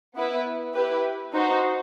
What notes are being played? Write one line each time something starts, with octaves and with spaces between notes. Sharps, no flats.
B3 E4 B4
E4 G4 B4
D#4 F#4 C5